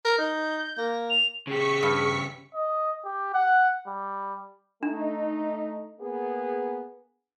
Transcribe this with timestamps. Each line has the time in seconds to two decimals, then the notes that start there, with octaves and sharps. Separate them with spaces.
0.05 A#4
0.18 D#4 G6
0.78 A#3
1.10 F7
1.47 C#3 G4 G#4 C#6 B6 C#7
1.83 G2
2.55 D#5
3.05 G4
3.34 F#5
3.87 G3
4.83 A3 D4 D#4
5.99 A#3 B3 G#4